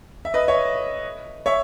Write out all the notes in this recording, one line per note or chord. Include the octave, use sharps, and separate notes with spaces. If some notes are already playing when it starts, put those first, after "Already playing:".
E5
B4 D#5
C#5 E5
C#5 E5